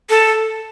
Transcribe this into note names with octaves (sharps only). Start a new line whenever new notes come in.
A4